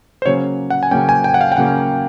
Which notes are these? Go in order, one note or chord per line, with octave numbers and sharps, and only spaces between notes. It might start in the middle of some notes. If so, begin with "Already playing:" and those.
C5
C#3 F#3 A#3 C#4 C#5
F#5
G#5
C#3 F#3 A#3 C#4 G5
G#5
G5
F#5
F5
G5
C#3 F#3 A#3 C#4 F#5